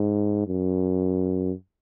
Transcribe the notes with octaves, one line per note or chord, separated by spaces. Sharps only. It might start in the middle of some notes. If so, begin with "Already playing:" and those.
Already playing: G#2
F#2